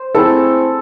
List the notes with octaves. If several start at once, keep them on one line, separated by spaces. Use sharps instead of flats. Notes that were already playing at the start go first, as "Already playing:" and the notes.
Already playing: C5
A3 C4 E4 G#4 A4